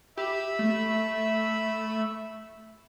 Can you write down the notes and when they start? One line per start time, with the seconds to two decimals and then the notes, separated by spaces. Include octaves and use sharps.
0.17 G4 E5 B5 E6
0.59 A3